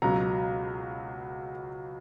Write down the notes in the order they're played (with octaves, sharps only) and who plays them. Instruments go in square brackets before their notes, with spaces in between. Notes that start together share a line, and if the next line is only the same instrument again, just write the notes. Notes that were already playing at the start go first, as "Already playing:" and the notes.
[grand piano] C#2 B2 F#3 A#5